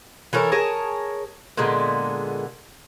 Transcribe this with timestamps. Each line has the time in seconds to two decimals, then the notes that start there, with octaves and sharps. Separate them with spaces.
0.33 E3 A4 A#4 C#5
0.52 G#4 A#4 C#5 A5
1.57 A#2 D3 G#3 B3